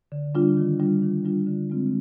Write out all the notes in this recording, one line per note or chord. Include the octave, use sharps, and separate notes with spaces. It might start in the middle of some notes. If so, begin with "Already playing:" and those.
D3
G3 D4 F4
D#3
G3 D4 F4
D#3
G3 D4 F4
D3
G#3 C4 F4